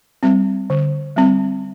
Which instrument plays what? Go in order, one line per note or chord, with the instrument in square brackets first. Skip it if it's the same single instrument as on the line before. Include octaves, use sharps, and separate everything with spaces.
[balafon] G3 C4
D3
G3 C4